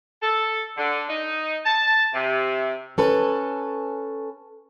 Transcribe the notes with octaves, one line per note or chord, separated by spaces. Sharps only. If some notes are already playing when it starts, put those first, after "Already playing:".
A4
D3
D#4
A5
C3
C#4 A4 B4